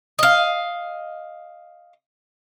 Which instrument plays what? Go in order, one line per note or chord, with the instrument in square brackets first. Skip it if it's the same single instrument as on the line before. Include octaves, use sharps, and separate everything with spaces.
[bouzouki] D#5 F5